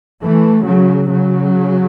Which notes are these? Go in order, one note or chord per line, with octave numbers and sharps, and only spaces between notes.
E3 A3
C#3 F#3
C#3 F#3